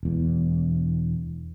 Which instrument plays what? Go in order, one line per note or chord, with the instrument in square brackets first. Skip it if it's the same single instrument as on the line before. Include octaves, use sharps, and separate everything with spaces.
[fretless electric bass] E1 E2